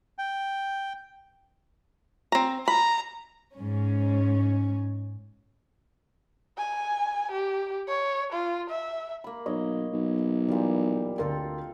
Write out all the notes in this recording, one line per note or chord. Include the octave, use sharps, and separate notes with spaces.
G5
C4 A#5
A#5 B5
G#2 C#4
G#5
G4
C#5
F4
E5
A#3 B5
B1 C#5 D#5
B1
A#2 E3 G3
D2 C4 F4 A4 A#4 G5